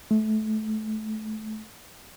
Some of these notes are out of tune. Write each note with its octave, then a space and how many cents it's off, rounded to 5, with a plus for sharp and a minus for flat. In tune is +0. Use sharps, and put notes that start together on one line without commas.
A3 -25